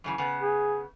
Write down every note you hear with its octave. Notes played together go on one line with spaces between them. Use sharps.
F#2 C#3 E3
C#3 B3
G#4